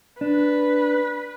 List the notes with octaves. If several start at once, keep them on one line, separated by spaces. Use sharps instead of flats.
D4 B4